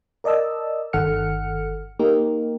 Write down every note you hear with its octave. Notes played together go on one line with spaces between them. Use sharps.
A#4 D5 D#5 A5 E6
G1 D#3 A4 F#5 F6 C#7
A#3 D#4 G4 A#4